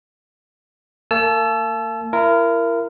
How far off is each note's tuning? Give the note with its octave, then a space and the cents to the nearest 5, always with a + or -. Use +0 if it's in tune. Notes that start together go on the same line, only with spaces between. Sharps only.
A#3 -40 A5 -30 E6 +25
E4 +40 A#4 -5